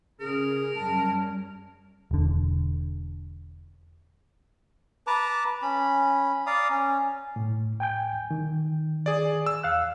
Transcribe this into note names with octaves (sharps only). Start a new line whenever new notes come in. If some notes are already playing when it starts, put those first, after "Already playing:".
C#3 G#4 A#4
F#2 G3 C#4 A5
E1 D3
B4 A5 A#5 D6
C#4 B5
D5 F5 A#5 D#6
C#4
A2
G5 G#5 G6
D#3
G#4 D5
E6
E2 F5 F#6